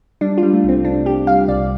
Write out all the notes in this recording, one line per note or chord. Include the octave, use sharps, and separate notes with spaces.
G3 D4
F4
G3
A3
C2 C4
C2 D4
G3 G4
G3 F5
C2 D5